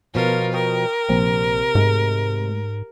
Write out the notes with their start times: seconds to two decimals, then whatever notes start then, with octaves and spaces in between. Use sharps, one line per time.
0.15 B2 F3 B3 F4 A#4
0.54 A#4 G5 C#6 D#6
1.09 A#1 C3 C4
1.75 G#2 G#3 A3